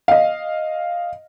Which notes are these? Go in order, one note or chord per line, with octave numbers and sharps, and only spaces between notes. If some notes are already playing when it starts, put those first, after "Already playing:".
D#5 F5